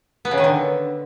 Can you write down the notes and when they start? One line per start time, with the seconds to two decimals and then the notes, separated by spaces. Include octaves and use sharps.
0.25 B3
0.31 C#3
0.38 D#3
0.44 D3